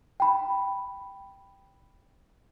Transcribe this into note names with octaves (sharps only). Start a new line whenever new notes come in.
G5 B5